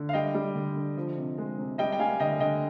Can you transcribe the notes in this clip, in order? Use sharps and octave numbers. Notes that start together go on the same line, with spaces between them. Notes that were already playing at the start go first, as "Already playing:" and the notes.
Already playing: D3
F5
G3 D#5 G5
G3
D3
D3
F3
C3
G#3
C3
G3 D#5 G5
G5
G3 F5 G#5
D3 D#5 G5
D3 D#5 G5